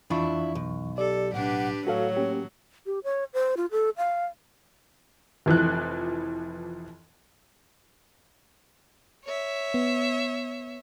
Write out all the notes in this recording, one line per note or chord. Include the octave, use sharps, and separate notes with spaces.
F2 E3 D4 E4 F4 C#6
B1
G4 A4 D5
A2 D4 G4 B4 F#5
A2 F#3 F#4 A4 C#5 F5
A#3 C#4 G4
G4
C#5
C5
F4
A4
F5
F1 E3 F3 F#6
C#5 E5
B3